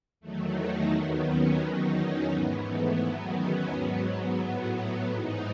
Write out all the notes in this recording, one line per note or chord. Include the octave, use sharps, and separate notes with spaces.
E2 D#3 F#3 A3
D#4
D#2 D#3 F#3 B3
C#4
E2 D#3 F#3 D#4
C#4
G#2 E3 B3
A3
E2 D#3 F#3 B3
C#4
G#2 F#3 B3
A2 F#3 B3
B3
G#2 E3 D#4